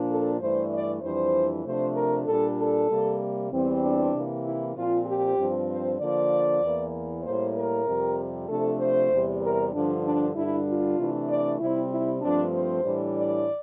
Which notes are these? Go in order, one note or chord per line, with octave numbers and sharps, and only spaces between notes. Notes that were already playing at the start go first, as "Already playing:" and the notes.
Already playing: A#2 F3 A#3 D4
A4
G2 E3 A3 D4 C5
D5
F2 E3 G3 D4 C5
C3 F3 A3 D4 C5
A#4
A#2 G3 D4 A4
A4
C3 G3 A#3
E2 E3 G3 C4
D4
C3 E3 A#3
E4
A#2 F3 C4 F4
G4
G2 F3 C4
C5
D3 F3 A#3 D5
E2 E3 A#3
A2 G3 A#3 C5
A#4
F2 C3 G3
C3 F3 A3 D4 A4
C5
E2 C3 G3
A#4
G2 D3 F3 D4
D4
G2 D3 G3 D4 E4
F4
C3 E3 A3 D4
D5
C3 G3 C4 E4
E4
G2 F3 A3 C4 D4
C5
A2 E3 G3 D4
D5